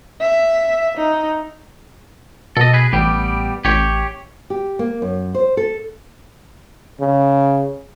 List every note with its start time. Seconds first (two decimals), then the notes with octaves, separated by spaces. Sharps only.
0.21 E5
0.98 D#4
2.57 B2 A4 D#5
2.74 G#4 B4
2.93 A1 G3 B3 G4
3.65 A1 G4 C#5
4.50 G4
4.79 A#3
5.02 F#2
5.34 C5
5.57 A4
7.00 C#3